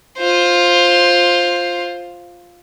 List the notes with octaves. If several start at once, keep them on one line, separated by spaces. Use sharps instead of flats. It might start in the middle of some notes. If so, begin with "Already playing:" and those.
F4 C5